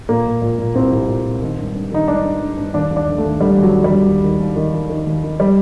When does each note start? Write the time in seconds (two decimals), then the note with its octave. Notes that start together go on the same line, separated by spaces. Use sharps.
0.08 A#2 A#3
0.25 A#2
0.41 A#2
0.58 A#2
0.74 C2 C4
0.92 C2
1.08 A#2
1.25 A#2
1.42 D#3
1.57 G2
1.74 G2
1.92 D#3 D#4
2.08 G2 D4
2.24 G2
2.40 G2
2.57 G2
2.74 D#2 D4
2.91 D#2
2.96 D4
3.08 D3
3.18 A3
3.24 D#2
3.40 D3 G3
3.57 D#2
3.63 F#3
3.73 D#2
3.84 G3
3.90 D3
4.07 D#2
4.24 D#3
4.40 D#2
4.56 D#3
4.74 D#3
4.89 D#3
5.06 D#2
5.23 D#3
5.40 G3